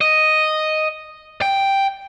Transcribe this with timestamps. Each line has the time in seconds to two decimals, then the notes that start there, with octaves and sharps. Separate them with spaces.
0.01 D#5
1.42 G5